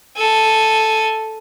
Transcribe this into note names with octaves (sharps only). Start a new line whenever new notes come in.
A4 G#5